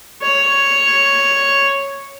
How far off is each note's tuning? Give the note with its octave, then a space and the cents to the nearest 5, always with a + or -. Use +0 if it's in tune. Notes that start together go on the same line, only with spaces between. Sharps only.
C#5 +0